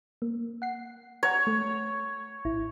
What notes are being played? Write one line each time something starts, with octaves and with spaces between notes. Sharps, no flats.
A#3
F#5 C7
C#5 F#5 A#5
A3
A1 E4